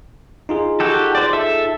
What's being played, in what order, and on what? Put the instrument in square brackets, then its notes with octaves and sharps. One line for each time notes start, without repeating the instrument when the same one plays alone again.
[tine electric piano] D#4 F4 G#4
[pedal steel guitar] F#4 G4 A4
C5 D5
A4 E5